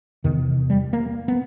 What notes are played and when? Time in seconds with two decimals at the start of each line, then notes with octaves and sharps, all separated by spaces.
0.24 E2 C3 D#3
0.70 G3
0.93 A#3
1.28 B3